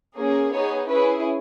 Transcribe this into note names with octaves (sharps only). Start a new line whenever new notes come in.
A#3 C#4 G#4
B3 D#4 G#4 C#5
C#4 E4 G#4 B4